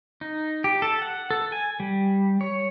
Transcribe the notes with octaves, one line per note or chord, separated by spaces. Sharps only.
D#4
G4
A4
F#5
A4
G#5
G3
C#5